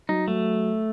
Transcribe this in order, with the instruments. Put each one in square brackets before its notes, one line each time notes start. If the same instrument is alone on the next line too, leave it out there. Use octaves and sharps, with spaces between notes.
[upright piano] F#3 [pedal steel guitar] D#4
[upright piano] F#3 [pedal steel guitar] A3